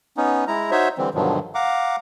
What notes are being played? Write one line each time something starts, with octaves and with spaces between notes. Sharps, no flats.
B3 C#4 D#4
G#3 E4 A#5
D#4 F#4 C5 C#5 E5
D3 E3 G3 C4
G2 B2 D3 D#3 F3 F#3
F5 F#5 A#5 D6